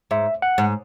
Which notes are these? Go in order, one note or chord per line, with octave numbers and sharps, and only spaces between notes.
G#2 E5
F#5
G#2